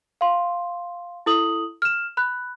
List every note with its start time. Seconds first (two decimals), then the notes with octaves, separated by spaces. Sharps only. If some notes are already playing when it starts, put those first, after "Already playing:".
0.21 F5 C6
1.26 E4 A4 D#6 F#7
1.82 F6 E7
2.17 B5 F#6